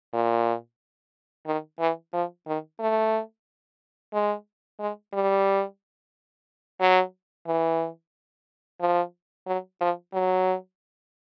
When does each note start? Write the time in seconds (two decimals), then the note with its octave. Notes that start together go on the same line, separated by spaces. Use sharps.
0.13 A#2
1.46 D#3
1.80 E3
2.13 F3
2.47 D#3
2.80 A3
4.13 G#3
4.80 G#3
5.13 G3
6.80 F#3
7.47 E3
8.80 F3
9.47 F#3
9.80 F3
10.14 F#3